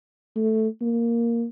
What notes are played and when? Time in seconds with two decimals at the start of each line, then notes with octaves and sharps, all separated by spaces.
0.36 A3
0.81 A#3